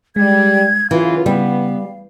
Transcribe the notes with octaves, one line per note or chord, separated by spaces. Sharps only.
G3 G#3 G#6
F#2 C#3 E3 F4 F5
C#3 G3 B3